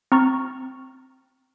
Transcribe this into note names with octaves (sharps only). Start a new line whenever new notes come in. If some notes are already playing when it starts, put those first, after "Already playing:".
C4 A#5 C#6 F6 A6